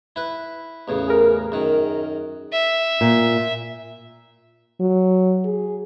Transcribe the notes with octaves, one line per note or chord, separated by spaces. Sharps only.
E4 B4
A1 E2 C#3
G#4 A#4
F#2 D#3
E5
A#2
F#3
G#4